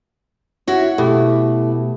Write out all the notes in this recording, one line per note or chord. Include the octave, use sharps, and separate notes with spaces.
E4 F#4 C#5
B2 A3 E4 G4